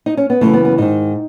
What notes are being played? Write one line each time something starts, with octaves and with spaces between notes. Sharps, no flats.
D#4
C#4
B3
F#2 C#3 E3 A3
B3
B3
G#2 D#3 D#4